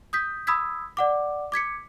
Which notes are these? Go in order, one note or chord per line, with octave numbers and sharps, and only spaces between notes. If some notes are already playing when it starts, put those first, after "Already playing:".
D#6 G6 B6
B5 D#6 E6 G#6 B6
D5 F#5 D6
D6 G#6 B6 C#7